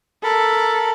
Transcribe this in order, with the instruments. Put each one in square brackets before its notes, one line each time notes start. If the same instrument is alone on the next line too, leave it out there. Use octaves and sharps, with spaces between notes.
[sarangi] A4 [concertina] A#4 B5